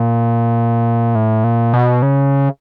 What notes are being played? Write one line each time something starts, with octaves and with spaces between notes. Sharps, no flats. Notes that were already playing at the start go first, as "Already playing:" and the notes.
Already playing: A#2
A2
A#2
B2
C#3